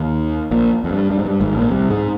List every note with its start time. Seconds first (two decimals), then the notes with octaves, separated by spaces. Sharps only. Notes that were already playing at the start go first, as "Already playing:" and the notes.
Already playing: D#2 D#3
0.51 A#1 A#2
0.84 F2
0.91 G2
1.11 G2
1.19 G#2
1.26 G2
1.41 G#1 G#2
1.56 A#1 A#2
1.71 C2 C3
1.90 G#2 G#3